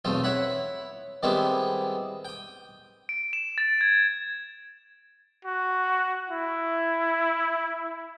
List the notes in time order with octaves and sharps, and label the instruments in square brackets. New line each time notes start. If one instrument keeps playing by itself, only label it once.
[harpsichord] B1 E2 A3 C4 F4
E4 C#5 F#5 B5
D#3 G3 G#3 B3 C4 E4
G5 D#6
[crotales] D7
E7
A6
G#6
[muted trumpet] F#4
E4